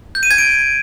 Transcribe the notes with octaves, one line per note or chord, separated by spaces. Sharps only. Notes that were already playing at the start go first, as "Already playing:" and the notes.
G6
D#7
G#6
D7